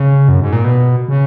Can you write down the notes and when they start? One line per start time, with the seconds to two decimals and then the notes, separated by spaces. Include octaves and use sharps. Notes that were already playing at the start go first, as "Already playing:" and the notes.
Already playing: C#3
0.29 F#2
0.40 G#2
0.53 A#2
0.64 B2
1.08 C#3